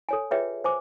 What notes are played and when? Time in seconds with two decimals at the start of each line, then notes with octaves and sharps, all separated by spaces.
0.09 A4 C#5 G#5
0.31 F4 G#4 B4 C#5 E5 G5
0.64 C5 G#5 D6